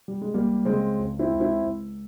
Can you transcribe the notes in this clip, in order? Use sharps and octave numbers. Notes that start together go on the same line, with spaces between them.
G3
G#3
C#2 G3 A#3
C#3 G#3 C4
C#2
C4 E4
C#2
C4 E4
C#2